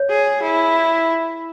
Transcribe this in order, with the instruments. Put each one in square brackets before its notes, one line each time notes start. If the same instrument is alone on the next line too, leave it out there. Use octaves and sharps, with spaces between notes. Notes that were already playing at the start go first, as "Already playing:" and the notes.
Already playing: [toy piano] C#5
[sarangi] G#4
E4